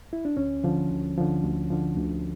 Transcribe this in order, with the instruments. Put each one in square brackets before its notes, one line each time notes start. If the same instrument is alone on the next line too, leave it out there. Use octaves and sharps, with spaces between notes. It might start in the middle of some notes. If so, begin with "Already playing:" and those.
[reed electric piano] E4
D4
D2 C#4
D3 F3
D2
D3 F3
D2
D3 F3
D2